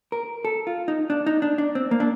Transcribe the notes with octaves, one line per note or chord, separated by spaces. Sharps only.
A#4
A4
F4
D#4
D4
D#4
D4
D4
C4
A#3
D4